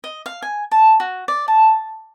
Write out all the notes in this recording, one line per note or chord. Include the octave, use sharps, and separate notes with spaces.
D#5
F5
G#5
A5
F#4
D5
A5